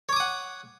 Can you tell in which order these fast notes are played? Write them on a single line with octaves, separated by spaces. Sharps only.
C#5 D6 D#6 F#5